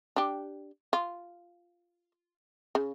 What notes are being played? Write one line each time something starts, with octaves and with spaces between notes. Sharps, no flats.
D4 G4
F4
C#3